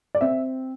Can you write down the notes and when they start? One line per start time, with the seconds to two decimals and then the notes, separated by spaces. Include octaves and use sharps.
0.15 D5
0.21 C4 E5